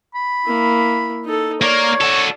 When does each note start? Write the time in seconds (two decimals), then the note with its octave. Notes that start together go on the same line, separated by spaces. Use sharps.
0.15 B5
0.46 A#3 E4
1.25 D#4 A4
1.62 A#3 A#4 C#5 D5
2.01 F#4 A4